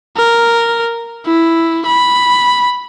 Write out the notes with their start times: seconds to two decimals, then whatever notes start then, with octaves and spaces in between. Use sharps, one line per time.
0.17 A#4
1.25 E4
1.86 B5